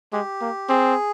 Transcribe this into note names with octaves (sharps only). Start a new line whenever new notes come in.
G#3 G4
A#3
C4 G#4